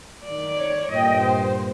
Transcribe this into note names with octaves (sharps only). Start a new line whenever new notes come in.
D#3 D5
C#5
G2 A#2 D#5 G5
C5